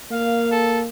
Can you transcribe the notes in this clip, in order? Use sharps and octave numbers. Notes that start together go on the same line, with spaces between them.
A#3 F5
A4